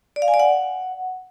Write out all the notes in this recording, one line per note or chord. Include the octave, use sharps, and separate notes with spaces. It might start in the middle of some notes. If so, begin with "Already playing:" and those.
D5
F5
G#5
D5
F#5